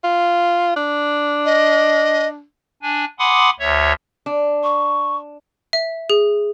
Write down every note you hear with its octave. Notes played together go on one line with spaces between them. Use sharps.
F4
D4
D#5
D4 G#5
F#5 G#5 B5 C6 D6 D#6
D2 C#5 E5
D4
C#6
E5
G#4